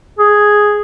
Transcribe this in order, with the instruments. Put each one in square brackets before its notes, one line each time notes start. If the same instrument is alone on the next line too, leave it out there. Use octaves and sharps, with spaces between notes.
[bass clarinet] G#4